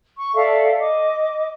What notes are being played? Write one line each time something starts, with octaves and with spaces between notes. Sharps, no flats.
C#6
A4 D5 E5 F5
D#5 D6